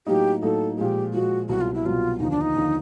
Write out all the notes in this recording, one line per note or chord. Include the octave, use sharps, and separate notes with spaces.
A2 F#3 A#3 D#4 G4
A2 F#3 A#3 D#4 A4
A#2 F3 G#3 G4
A#2 F3 G#3 F#4
C2 B2 F#3 F#4
F4
E4
C2 B2 F#3 F4
D#2 D3 F3 D#4
D4
D#4
D#2 D3 F3